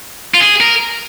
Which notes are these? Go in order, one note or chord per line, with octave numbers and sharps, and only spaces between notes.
F4
G#4
A#4